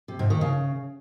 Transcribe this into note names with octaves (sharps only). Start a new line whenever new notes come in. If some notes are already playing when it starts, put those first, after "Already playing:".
C3
G#2
D#3
C#3